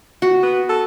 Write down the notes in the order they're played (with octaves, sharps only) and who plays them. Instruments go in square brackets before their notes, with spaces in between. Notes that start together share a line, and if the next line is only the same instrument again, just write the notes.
[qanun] F#4
[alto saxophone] B3
A4